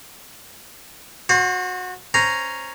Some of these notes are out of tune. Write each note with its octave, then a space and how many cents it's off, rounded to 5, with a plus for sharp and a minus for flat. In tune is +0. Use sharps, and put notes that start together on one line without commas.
F#4 -20 C5 +30
C#4 +0 C5 -10 A#5 +0